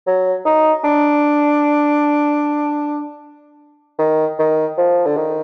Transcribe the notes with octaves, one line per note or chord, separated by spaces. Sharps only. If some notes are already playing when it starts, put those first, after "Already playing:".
F#3
D#4
D4
D#3
D#3
F3
D3
D#3